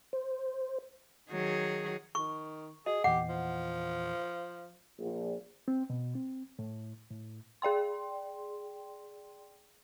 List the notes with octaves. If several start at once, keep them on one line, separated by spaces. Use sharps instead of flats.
C5
D#3 F#3 G#4
D#3 C#6
F#4 G#4 D#5
E2 A#2 E3 G4 F#5
F3
A#1
C4
B2
C4
A2
A2
G#4 D5 G5 C6